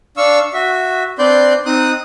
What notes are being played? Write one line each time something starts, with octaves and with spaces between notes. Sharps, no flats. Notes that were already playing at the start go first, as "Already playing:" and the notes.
D4 F5 C#6 E6
F#4 E5
C4 D4 B4 D5 C6 G6
C4 D#4 D#6 F#6